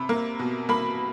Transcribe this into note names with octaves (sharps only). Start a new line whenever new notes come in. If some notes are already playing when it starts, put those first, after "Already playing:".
Already playing: C3 B5
A#3
B2
A#3 B5